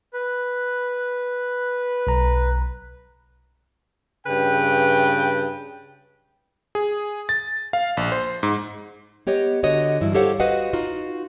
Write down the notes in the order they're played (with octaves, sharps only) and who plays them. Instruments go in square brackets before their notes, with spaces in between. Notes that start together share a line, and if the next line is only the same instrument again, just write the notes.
[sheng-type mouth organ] B4
[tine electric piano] B1 A#5
[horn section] G2 C#3 B4 G5
[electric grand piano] G#4
A6
F5
A#1
C5
G#2
[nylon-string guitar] B3 G4 C#5 D#5
D3 F#4 C#5 D#5
G2 E3 E4
G4 A4 C5 C#5 F5 F#5
F#4 B4 C5 D#5 F5 F#5
D#4 F4 F#4